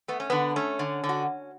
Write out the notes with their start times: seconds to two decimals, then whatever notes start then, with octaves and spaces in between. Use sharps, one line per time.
0.08 A3 B3
0.20 C#4
0.30 D3 B3
0.56 A3 C#4
0.79 D3
1.04 D3
1.09 F#4